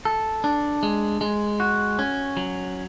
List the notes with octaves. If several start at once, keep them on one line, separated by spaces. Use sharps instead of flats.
A4
D4
G#3
G#3
F#4
C#4
F#3